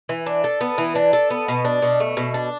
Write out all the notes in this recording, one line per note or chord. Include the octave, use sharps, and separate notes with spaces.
E3
D4
A4
B3
E3
D4
A4
B3
B2
D4
B2
A3
B2
D4